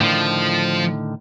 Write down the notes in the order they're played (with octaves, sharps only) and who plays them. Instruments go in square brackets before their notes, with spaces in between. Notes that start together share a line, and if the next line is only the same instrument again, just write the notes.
[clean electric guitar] A2 D3 D#3 [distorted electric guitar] F3